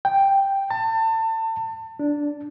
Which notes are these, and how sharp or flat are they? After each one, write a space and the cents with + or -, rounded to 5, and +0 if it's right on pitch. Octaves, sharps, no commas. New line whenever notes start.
G5 +5
A5 +30
D4 -5